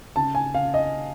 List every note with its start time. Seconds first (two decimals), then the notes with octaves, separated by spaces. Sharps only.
0.16 C#3 A5
0.35 G#5
0.54 C#3 F5
0.74 D#5